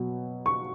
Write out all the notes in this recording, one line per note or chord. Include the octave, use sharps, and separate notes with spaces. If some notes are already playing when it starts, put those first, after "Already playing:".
Already playing: B2 F#3
C#6